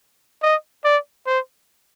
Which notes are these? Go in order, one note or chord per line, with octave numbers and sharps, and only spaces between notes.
D#5
D5
C5